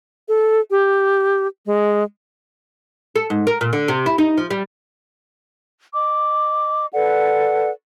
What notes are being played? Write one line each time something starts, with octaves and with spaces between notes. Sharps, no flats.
A4
G4
G#3
A4
G#2
A#4
A#2
D3
C3
E4
D#4
F3
G3
D#5 D6
A4 B4 D5 F#5